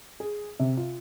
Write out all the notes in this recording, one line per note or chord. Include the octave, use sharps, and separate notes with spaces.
G#4
C3
F4